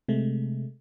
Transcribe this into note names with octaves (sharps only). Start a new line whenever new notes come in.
C3 G#3 A3